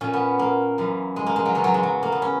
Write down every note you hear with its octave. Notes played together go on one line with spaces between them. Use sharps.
A#2 C#4
B3
A#3
F#2 E3
G#3
A#3
G#3
F#3
E2 C#3 E3 G#3
F#3
G#3
F#3
A#3
B3
C#4